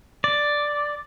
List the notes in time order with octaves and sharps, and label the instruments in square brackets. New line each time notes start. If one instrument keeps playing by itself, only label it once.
[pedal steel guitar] D5